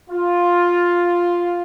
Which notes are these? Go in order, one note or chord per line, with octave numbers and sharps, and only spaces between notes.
F4